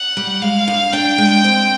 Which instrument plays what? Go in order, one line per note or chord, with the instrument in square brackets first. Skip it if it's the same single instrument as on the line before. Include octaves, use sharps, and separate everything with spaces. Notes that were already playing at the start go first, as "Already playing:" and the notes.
Already playing: [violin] F#5
[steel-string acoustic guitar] G3
[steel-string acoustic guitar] G#3 [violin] F5
[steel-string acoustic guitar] G2
[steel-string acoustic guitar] D4 [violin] G5
[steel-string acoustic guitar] G#3
C4